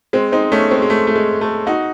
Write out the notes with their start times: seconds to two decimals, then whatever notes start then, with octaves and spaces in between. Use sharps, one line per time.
0.13 G#3 C4
0.32 C4 D#4
0.52 A3 C#4
0.71 G#3 C4
0.82 G#3
0.90 A3
1.07 A3
1.15 G#3
1.41 A3
1.67 D#4 F#4